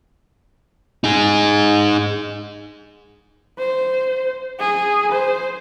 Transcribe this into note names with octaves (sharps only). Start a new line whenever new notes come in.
D#4 G#4
C5
G#4
C5